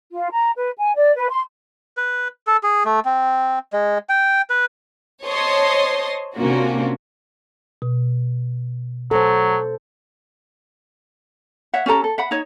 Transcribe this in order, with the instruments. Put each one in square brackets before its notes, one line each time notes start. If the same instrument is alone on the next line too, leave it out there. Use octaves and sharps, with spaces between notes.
[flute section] F4
A#5
B4
G#5
D5
B4
C6
[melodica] B4
A4
G#4
A3
C4
G#3
G5
B4
[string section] C5 C#5 D#5 A5 C6 D#6
C3 A#3 C#4 D4 F4 F#4
[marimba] B2
[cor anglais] F#3 [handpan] A4 C5
[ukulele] C#5 E5 F#5
C#4 G4 A4 A#5
A4
E5 F#5 B5
D#4 C#5